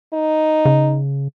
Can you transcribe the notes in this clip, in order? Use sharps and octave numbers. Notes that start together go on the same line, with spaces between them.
D#4
C#3